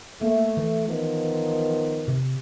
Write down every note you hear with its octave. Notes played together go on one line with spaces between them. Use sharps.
A3 A#3
E3
D#3 F3 B3
C3